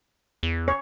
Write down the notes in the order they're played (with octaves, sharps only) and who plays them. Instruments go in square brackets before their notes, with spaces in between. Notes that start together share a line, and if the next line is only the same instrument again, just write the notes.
[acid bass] E2
[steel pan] C#5